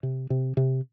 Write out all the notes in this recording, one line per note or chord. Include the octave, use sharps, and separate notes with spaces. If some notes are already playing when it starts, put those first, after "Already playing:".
C3
C3
C3